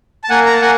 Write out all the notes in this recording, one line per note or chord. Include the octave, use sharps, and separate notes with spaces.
A5
A#3 F#5 G#5
A#5
A5
A#3 F#5 G#5